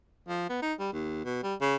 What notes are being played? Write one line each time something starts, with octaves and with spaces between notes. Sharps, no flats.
F3
B3
D#4
G3
D#2
B2
G3
C#3